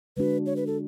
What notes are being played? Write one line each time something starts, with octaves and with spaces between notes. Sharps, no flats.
D3 G#3 D4 F#4 B4
C#5
B4
A4